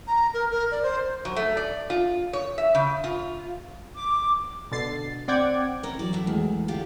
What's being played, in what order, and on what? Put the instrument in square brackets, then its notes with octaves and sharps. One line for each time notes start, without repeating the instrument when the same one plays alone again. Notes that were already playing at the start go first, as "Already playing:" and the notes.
[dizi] A#5
A#4
A#4
D5
C5
[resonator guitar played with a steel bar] F#3
A3
D5
F4
C#5
E5
C#3
F4
[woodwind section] D6
[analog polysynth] B2 D3 A6 C7
C4 D5 F#5 G5 D6 G#6
[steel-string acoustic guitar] C#4 E4 A#4
[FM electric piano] E3 F#3 [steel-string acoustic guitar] D5
[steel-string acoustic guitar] A2 E4
[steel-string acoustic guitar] E2 [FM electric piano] G#3 A3
[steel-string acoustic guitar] D3 F4 G4